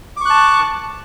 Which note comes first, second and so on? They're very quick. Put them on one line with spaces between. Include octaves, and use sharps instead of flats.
D6 C#6 F#6 A5